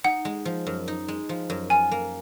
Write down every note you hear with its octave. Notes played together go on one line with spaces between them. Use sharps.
D#4 F#5
G#3
F3
F#2
D#4
G#3
F3
F#2
F4 G#5
A#3